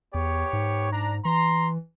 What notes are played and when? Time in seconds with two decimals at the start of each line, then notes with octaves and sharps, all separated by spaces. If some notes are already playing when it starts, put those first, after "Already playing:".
0.14 E2 B3 G4 C#5
0.53 G#2
0.93 D4 A#5
1.25 E3 A#5 C6